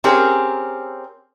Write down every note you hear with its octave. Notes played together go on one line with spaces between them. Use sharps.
C4 C#4 G4 G#4 A#4